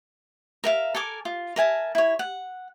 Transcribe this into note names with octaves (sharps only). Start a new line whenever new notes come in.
A#4 E5 F5
A4 A#4 G#5 D6
F4
A#4 E5 G#5 A5
E4 C#5
F#5